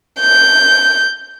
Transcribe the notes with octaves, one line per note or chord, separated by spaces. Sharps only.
G6